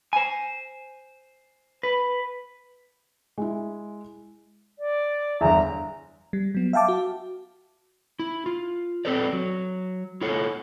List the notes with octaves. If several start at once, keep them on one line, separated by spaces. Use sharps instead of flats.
C5 G#5
B4
G#3 E4
D5
G1 E2 E5 A#5
G3
F#3 B3
E5 F5 G5 A5 D6
F#4
E4
F4
C4 A4 B4 C5 D5
F#3
E4 F4 A4 C#5 F#5